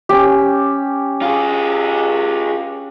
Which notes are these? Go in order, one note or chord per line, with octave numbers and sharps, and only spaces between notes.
C#4 G4
F4 G#4